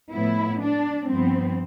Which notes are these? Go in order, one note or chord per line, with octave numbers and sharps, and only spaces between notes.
A2 F3 B3 E4
D4
G2 F3 B3 C4